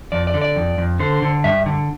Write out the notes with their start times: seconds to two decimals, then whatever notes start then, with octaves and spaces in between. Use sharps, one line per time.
0.12 F2 D5
0.27 D5
0.34 D3
0.42 D5
0.56 F2
0.78 F2
1.00 D3 C5
1.22 D3
1.44 G2 E5
1.66 D3